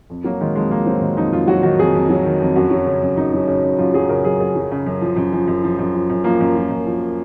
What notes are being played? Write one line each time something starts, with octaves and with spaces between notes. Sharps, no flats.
F2
F#3 A#3
D#3 G#3
F2 G#3
F2 A#3
F#3 C4
D#3
F2 D#4
F2 F4
F#3 F#4
D#3 F#4
F2 G#4
F2
F#3
D#3
F2
F#2 F#4
F#3
C#3
F#2
F#2 D#4
F#3
C#3
F#2
F#2 F4
F#3 G#4
C#3 A#4
F#2 G#4
F#2 G#4
F#3
C#3
F#2
F3
F#2
F3
F#2
F3
F#2
F3
F#2
F3 A#3
F#2
F3
F#2
F3